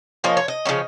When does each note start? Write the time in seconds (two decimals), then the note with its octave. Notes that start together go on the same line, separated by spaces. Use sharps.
0.24 F3 A#3 C#4 D#5
0.37 C#5
0.48 D#5
0.65 C#3 F3 A#3 C#4